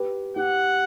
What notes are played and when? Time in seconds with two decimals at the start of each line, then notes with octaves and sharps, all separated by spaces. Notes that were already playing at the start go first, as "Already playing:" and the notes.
Already playing: G4 B4
0.36 G4 F#5